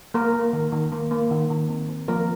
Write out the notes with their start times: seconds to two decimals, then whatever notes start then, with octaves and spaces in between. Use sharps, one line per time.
0.14 A#3 A#4
0.34 A#3
0.53 D#3
0.72 D#3
0.92 A#3
1.11 A#3
1.31 D#3
1.50 D#3
1.69 C4
1.89 C4
2.08 F3 A#3 A#4